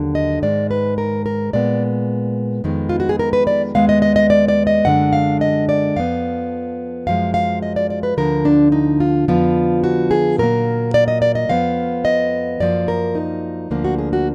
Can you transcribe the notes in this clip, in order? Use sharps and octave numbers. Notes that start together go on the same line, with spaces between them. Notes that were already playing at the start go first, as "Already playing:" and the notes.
Already playing: D#2 D3 F#3
D#5
G#2 D#3 G#3 D5
B4
A#4
A#4
A#2 G#3 B3 D5
F2 D#3 G#3 B3
F4
F#4
G#4
A#4
B4
D5
D#2 D#3 G#3 B3 F5
D#5
D#5
D#5
D5
D5
D#5
F#2 D3 G#3 F#5
F5
D#5
D5
F2 F3 B3 F5
F#2 F3 G#3 F5
F5
D#5
D5
D5
B4
D2 D3 F3 A#4
D4
D#4
F4
F2 D3 F3 B3 F4
F#4
G#4
A#2 F#3 A#3 A#4
D5
D#5
D5
D#5
F2 F3 B3 F5
D#5
F#2 F3 A#3 D5
A#4
D#4
D2 D3 F3 A#3
F#4
G#4
F#4